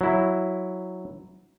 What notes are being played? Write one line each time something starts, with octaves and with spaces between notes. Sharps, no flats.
F#3 E4